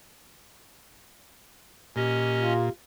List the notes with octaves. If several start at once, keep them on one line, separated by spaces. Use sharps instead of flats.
A#2 C#4 G4 D#5
F4